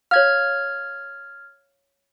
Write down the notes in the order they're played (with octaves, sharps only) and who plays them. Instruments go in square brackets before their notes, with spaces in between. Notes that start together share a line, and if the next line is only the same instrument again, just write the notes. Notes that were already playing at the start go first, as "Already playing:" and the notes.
[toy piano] C#5 F5 [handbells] F6 G#6